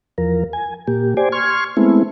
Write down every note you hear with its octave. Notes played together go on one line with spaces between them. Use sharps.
E2 F3 A#4
G#5
A#2 A#3 G4
G4 C5 D5 G#5
C6 C#6 F6 G#6
G#3 A3 B3 C4 E4